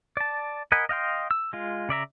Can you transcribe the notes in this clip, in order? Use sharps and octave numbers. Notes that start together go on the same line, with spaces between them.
D5 A5
A#4 D#5 F#5 G#5 B5
D#5 F5 G5 C6
E6
G#3 F4
C#3 D5 E5 A#5